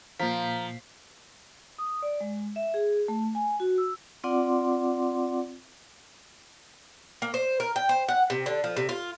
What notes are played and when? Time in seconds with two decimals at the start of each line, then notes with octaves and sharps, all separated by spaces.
0.19 A#2 F3 A#4 B6
1.78 D#6
2.02 D5
2.20 G#3
2.56 E5
2.74 G#4
3.08 A3
3.35 G#5
3.60 F#4
3.78 E6
4.24 C4 F4 D5 F#5 C6 D6
7.22 A#3
7.34 C5
7.60 A#4
7.76 G5
7.89 C5
8.08 F#5
8.30 C3
8.46 D3
8.64 F3
8.77 C3
8.89 F4